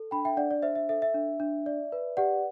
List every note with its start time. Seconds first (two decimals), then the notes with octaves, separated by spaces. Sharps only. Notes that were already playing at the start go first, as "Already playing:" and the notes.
Already playing: A4
0.11 D4 G5 B5
0.25 E5 G5
0.37 D4 D5 F#5
0.51 D5
0.62 C5 E5
0.75 E5
0.89 A4 E5
1.02 E5
1.14 D4
1.40 D4
1.66 D5
1.92 B4
2.17 G4 D5 F#5